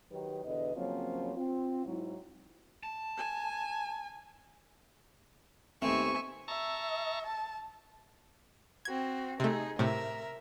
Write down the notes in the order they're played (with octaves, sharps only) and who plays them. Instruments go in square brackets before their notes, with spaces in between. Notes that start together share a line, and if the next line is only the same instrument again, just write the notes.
[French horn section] D#3 F#3 D#4 G4 B4
E2 B2 D3 B4 D#5
C#3 F3 F#3 A#3 C4 C#4
C4 F4
G#2 F#3 E4
[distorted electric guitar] A5
[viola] G#5
[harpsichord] D#2 A3 [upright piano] B3 C4 [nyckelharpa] E5 G#5 [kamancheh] C#6
[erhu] E5 [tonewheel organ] A5 A#5 C#6
[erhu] A5
[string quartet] C4 F#4 [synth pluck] G#6
[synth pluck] C3 A3 [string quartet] D#4 G#4
[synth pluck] A2 C3 [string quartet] A#4 E5